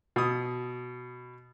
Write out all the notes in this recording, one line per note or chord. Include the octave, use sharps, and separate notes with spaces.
B2 D#6